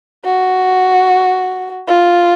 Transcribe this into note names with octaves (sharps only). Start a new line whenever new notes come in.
F#4
F4